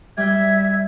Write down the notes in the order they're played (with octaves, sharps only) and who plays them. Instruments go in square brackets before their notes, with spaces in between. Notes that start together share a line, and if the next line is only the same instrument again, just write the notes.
[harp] G3 G6 [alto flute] E5 [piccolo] G#6